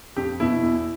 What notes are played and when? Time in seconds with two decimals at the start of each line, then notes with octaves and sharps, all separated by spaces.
0.16 F2 G4
0.40 B2 E4
0.63 E2